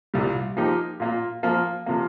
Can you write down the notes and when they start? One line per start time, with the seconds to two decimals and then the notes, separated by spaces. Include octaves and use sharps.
0.14 C2 A#2 G3
0.57 F3 A#3 D#4 G4
1.00 A#2 A#3 F4
1.43 F3 A#3 F4 A#4
1.86 C3 F3 A#3